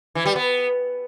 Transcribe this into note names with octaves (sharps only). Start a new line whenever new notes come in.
E3
G3
B3